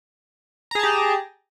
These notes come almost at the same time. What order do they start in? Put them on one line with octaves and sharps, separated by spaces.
A#5 G#4 A5 G4